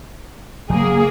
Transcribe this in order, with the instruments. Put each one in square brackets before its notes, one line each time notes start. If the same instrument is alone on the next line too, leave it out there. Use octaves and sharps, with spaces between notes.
[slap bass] F#1 C#3 F#3 [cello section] A#3 G#4